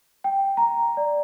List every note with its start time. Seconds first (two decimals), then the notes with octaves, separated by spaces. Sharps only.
0.24 G5
0.57 A#5
0.97 D5